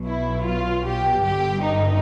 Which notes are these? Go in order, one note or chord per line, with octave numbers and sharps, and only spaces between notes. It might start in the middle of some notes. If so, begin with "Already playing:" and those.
Already playing: B1 B2 F#3
E4
F4
G4
G1 G2 D3 G4
D#4